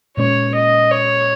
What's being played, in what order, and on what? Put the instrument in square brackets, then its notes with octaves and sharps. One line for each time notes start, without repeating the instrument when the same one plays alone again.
[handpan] A#2 G#3 C#4 [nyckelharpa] C#5
[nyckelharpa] D#5
C#5